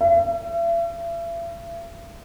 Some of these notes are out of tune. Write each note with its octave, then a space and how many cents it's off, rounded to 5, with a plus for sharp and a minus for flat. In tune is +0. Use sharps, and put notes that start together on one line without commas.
E5 +40